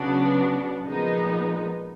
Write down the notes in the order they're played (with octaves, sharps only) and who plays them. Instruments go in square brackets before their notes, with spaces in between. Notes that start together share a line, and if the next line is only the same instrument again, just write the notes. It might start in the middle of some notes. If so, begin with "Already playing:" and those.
Already playing: [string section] C#3 F#3 B3 D4 F#4
A#2 F3 G#3 B3 D#4